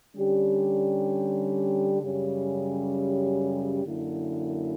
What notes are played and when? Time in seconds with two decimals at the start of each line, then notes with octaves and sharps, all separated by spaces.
0.16 D3 G3 C#4 G4
2.00 F#2 C#3 G3 C#4 G4
3.84 F#2 D3 A#3 E4